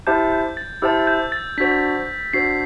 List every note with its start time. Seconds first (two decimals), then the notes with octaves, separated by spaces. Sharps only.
0.07 E4 G4 C5 E5 A5 G6
0.32 G6
0.57 A6
0.82 E4 G4 C5 E5 A5 E6
1.07 G6
1.32 A6
1.58 D4 F#4 C5 B6
2.33 D4 F#4 C5 C7